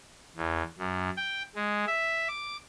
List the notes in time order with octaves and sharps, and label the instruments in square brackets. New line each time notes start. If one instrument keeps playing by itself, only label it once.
[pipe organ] E2
F#2
G5
G#3
E5
D6